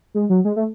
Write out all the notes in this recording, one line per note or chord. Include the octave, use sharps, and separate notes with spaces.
G#3
F#3
G#3
A3